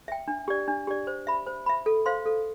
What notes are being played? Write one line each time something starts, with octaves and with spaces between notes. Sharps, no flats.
E5 G5
D4
G4 D5
D4
G4 D5
C5
E5 B5
C5
E5 B5
A4
C5 F5 C6
A4